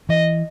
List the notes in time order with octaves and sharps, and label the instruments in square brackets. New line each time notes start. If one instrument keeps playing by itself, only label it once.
[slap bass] E3 [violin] D#5